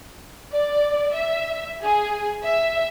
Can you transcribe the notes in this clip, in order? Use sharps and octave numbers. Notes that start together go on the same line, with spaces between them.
D5
E5
G#4
E5